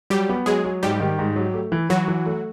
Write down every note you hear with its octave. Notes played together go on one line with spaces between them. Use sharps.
F#3 G3 G4
B3
F#3 G#3 G#4
F#3
G#2 G3 G4
D#3
G#2
F#3
A3
E3
E3 F#3 F#4
E3
A3